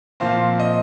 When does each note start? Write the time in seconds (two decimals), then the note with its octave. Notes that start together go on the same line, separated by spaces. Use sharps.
0.20 A#2 F3 C4 F5
0.60 D#5